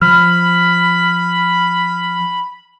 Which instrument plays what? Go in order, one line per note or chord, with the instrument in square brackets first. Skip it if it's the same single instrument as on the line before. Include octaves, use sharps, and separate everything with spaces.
[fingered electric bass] F3 [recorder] B5 [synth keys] F6